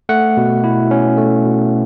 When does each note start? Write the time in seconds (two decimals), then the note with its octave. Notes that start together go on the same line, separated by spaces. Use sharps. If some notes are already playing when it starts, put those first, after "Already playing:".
0.09 A3 F#5
0.37 B2
0.64 E4
0.91 C#4
1.18 A3
1.45 B2